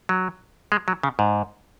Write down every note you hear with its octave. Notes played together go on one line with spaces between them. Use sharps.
F#3
G#3
F#3
C#3
G#2